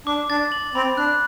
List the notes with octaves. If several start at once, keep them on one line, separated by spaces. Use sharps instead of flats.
D4 D6
D4 A6
F#7
C4 B5
D4 F#6